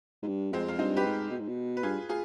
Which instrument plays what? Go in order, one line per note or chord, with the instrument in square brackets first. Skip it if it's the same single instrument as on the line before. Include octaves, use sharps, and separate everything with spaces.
[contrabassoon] G#2
G2
[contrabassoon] F2 [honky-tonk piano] G#3 C4
[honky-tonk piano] F4
[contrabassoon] G2 [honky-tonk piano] C4 D#4
[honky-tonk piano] G4 B4
[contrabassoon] G#2
B2
G#2
B2
[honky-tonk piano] B4
[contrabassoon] G2 [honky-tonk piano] F4 G#4
[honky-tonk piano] F4 G#4